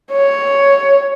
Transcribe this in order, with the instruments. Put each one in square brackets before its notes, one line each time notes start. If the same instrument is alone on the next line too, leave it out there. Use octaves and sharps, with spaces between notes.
[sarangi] C#5